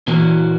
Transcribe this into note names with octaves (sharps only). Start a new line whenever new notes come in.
A#2 E3 A#3 C#4 F#4